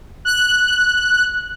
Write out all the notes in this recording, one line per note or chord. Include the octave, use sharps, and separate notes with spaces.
F#6